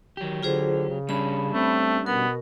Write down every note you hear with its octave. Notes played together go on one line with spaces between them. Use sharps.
D#3 F#3 G4
D3 F4 G#4 C5
C#3
G3 C#4 D4 B5
A3 C4
B2 B3 A#4